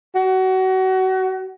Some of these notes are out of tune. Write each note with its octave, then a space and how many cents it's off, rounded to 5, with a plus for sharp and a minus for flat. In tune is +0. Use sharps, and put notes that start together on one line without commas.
F#4 +25